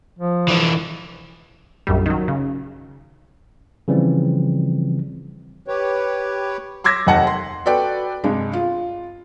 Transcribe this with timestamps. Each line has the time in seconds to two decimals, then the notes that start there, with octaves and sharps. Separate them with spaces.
0.19 F3
0.48 E3 D4
1.87 A#1 F#2 G3
2.06 D#3 F#3
2.28 C#3
3.88 C#3 E3 F3 G3 C4
5.68 G4 B4 C#5
6.84 C6 D6 E6 G#6 A#6 B6
7.06 F1 D#2 D#5 F#5 G5 A5
7.27 C6
7.65 F#4 A4 B4 D5 G5
8.24 G2 C3 G#3 D4
8.53 F4